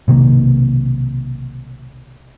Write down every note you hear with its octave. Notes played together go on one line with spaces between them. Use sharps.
B1 C3 D#3 A#3